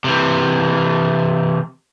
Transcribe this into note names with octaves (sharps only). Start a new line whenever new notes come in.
C3 E3